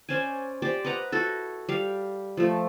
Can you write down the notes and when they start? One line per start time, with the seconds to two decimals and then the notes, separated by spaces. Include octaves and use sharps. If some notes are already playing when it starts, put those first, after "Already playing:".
0.09 C#4 C5 D5 G#5
0.62 G4 C5 D5
0.85 B4 D#5 F#5 A#5
1.12 E4 F#4 A4
1.69 G3 F5
2.37 F3 A3